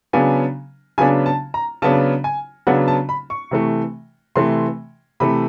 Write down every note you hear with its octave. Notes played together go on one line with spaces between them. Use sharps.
C#3 F#3 B3 D4 G#5
C#3 F#3 B3 D4 G#5
A5
A#5
C#3 F#3 B3 D4 A5
G#5
C#3 F#3 B3 D4 F#5
A5
B5
C#6
C3 E3 A3
C3 E3 A3 C6
C3 E3 A3 B5